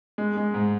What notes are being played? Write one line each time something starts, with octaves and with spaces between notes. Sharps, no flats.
G#3
G#3
G#2